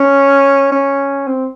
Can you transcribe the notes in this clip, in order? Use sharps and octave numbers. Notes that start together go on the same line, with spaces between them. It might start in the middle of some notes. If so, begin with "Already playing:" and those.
Already playing: C#4
C#4
C4